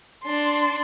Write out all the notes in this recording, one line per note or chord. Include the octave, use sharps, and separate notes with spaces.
D4 C6